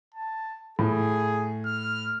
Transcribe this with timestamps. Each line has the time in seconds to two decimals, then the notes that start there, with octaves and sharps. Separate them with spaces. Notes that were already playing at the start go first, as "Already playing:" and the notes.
0.14 A5
0.79 A2 G#4
1.66 F6